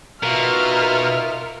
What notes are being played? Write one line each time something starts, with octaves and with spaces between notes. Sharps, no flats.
B2 D#4 F4 A#4 E5 F6